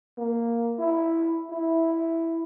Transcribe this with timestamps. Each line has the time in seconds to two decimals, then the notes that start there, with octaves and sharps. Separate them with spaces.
0.18 A#3
0.79 E4
1.51 E4